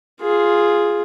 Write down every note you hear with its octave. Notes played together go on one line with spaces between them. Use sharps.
F4 G#4